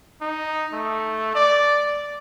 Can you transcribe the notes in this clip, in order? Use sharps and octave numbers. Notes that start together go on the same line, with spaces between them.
D#4
A3
D5